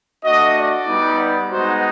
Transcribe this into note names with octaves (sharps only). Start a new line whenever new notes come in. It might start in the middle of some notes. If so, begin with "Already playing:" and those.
A3 D4 F#4 D#5
D5
G3 B3 D#4
G#3 B3 D#4 F#4 C5